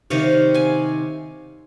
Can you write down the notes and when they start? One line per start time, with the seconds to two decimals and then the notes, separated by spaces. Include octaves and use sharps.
0.10 C3 D#3 G3 C#5 F5
0.54 F5 G#5